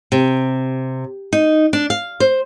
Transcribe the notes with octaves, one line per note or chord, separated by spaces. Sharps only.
C3
D#4
D4
F5
C5